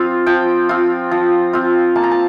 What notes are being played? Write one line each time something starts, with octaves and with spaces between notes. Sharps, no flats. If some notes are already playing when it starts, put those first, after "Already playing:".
Already playing: F3 C4 F4
F3 G5
C4 F4
F3
C4 F4
A#3 A5
A#5
A5